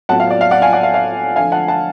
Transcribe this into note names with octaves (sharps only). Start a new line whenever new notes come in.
A2 F#3 B3 F4 F#5 A5
F5
D5
F5
D5 F#5
F5 G#5
D5 F#5
F5
F5
D3 F3 A3 F5 G#5
F#5 A5
F#5 A5